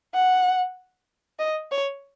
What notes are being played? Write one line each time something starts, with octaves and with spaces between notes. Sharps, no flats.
F#5
D#5
C#5